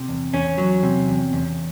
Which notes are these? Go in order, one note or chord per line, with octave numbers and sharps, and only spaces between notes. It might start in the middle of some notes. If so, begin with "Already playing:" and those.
Already playing: C3
E2
E2 C#4
F#3
C3
E2
E2